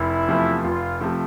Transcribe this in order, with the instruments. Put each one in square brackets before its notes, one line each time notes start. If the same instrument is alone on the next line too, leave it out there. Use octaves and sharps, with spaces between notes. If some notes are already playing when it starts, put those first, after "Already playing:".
Already playing: [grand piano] F1 [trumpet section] E4
[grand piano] E2 C3 F3 A3
[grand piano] F1 [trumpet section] F4
[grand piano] C3 F3 A3